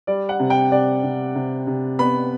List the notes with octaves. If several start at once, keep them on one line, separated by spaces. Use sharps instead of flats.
G3 D5
F#5
C3
G5
C3 D5
C3
C3
C3
B3 B5